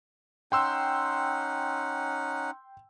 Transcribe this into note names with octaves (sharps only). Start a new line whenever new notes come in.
C#4 D#4 F#5 G5 C6 E6